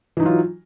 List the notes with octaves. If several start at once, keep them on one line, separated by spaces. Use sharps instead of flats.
E3 F#3 D#4 F4